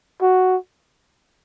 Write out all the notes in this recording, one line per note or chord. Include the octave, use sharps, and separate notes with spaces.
F#4